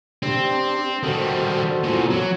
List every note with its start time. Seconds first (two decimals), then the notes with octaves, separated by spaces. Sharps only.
0.23 C4 D4 G4
1.03 D#3 G3 F#4 A4 C5
1.83 E2 A#2
2.10 F#3